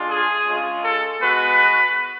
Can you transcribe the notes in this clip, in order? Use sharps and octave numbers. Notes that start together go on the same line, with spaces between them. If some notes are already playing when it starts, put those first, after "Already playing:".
Already playing: G#3 D4 F4
G#4
G#3 C#4 F4
A4
G#3 B3 F#4 B4